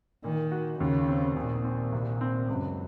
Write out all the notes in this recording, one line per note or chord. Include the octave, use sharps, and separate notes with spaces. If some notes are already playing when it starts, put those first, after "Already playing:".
A#2 D#3
F#4
D#2 C#3
C4
A#1 A#2
C4
C2
C4
C#2 F#2